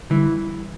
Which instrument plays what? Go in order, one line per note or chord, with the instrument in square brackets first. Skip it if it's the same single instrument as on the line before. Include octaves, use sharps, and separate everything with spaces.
[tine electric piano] D3 G3 [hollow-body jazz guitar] E3